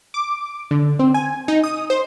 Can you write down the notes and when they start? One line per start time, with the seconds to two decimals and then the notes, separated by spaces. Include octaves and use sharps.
0.14 D6
0.71 D3
0.99 C4
1.14 G#5
1.48 D#4
1.64 D#6
1.90 C5